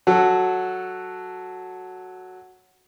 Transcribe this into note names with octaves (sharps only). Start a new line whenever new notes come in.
F#3 F#4 A4